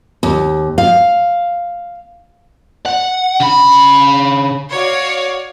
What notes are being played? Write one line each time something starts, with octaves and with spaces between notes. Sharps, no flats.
D#2
F5
F#5
C#3 B5
F#4 C#5 D5 F5